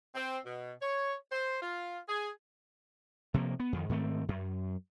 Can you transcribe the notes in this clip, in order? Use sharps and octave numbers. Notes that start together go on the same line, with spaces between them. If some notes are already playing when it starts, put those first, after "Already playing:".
C4
B2
C#5
C5
F4
G#4
C3 F3 G3 A#3
B3
F2 D#3
G#2 D#3 A3 C4
F#2